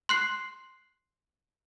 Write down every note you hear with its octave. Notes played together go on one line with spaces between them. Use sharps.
C6 F#6 C7